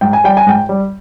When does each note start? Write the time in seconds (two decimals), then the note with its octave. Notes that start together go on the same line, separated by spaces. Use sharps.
0.01 G#2 G5
0.13 G#5
0.24 G3 G5
0.37 G#5
0.46 G#2 G5
0.69 G3